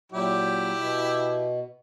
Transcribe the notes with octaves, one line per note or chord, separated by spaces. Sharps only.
A#2 F#3 E4 G4
B2